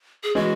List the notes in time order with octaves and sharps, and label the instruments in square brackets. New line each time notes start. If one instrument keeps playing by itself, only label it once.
[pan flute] G#4
[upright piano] E3 G#3 C#4 [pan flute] F#4